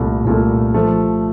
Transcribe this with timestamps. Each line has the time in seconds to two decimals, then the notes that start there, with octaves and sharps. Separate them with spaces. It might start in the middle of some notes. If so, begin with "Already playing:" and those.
Already playing: C2 A#2 A3
0.25 C2 A#2 A3
0.74 F3 A3